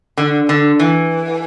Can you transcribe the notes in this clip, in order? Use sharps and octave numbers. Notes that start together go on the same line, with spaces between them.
D3
D3
E3